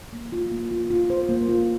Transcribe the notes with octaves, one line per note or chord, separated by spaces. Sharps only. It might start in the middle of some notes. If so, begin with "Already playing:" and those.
A#3
F4
A#3
F4
F4
C5
A#3
F4